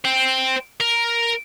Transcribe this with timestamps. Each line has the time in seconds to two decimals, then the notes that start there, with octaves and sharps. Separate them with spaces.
0.05 C5 G5
0.80 A#4